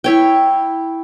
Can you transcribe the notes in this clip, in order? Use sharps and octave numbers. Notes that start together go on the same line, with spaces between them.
E4 C#5 G5